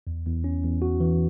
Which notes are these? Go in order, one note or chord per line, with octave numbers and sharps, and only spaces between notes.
E2
E2
C#4
E2
F#4
E3